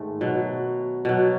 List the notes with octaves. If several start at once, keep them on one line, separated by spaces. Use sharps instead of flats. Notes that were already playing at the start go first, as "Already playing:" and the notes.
Already playing: G#2 D#3 G#3 A3
B2 F#3
B2 F#3